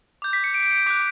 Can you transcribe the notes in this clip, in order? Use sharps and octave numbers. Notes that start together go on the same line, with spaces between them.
D6 G6
B6
C#7
D7
C#7
D6 F#6 B6